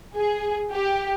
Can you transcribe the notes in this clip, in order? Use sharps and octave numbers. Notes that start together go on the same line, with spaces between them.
G#4
G4